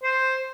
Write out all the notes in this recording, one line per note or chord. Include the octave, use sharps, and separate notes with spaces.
C5